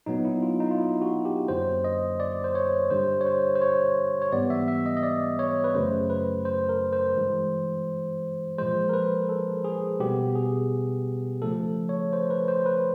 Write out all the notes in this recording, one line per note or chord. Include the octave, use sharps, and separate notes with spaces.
A#2 F#3 B3 D#4
E4
F4
D#4
F4
E4
F#4
G4
F#2 D3 F#3 A#3 C5
D#5
D5
C5
C#5
G2 D3 G3 C5
C#5
C5
C5
C#5
C#5
G#2 E3 G3 B3 D5
E5
E5
D#5
D#5
D5
C#5
B4
F#2 C#3 F#3 A3 C5
B4
C5
A#4
C5
G2 E3 G#3
A#2 F3 G#3 C5
A#4
B4
A4
G#4
B2 G3 B3 G4
G#4
C#3 F3 A3 A4
C#5
C5
B4
C5
B4